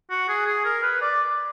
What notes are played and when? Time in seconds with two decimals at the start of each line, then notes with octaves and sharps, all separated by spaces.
0.10 F#4
0.29 G#4
0.47 G#4
0.65 A#4
0.83 B4
1.02 D5